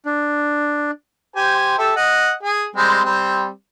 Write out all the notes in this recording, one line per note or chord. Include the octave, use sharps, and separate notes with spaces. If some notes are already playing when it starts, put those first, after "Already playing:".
D4
G4 C5 G#5
G4 A4 E5
D#5 F#5
G#4
G3 G#3 C4
G3 C4